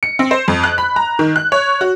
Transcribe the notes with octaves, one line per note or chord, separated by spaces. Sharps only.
C#7
C4
C5
F2
F#6
B5
A#5
D#3
F#6
C#5
F#4